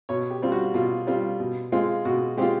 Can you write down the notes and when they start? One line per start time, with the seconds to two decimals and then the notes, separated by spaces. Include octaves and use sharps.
0.09 B2 C#5
0.30 G4
0.42 G3 C4 F4
0.52 F#4
0.74 B2 F4
1.07 G3 C4 F4
1.40 B2
1.72 G#3 C4 F4
2.05 B2 F#4
2.37 G#3 C4 F4 G4